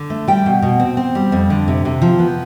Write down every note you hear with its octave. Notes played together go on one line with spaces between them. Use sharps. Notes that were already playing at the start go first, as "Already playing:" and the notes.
Already playing: D3
A3
G3 G5
B2
B2
C4
C4
G3
F2
D3
C3
C3
F3
B3